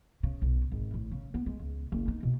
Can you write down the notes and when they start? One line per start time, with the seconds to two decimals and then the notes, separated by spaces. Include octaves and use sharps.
0.23 C#3
0.42 B1
0.72 G#1
0.94 A1
1.12 C#3
1.34 B3
1.46 G#3
1.59 C#2
1.92 F#1
2.08 D#4
2.23 B2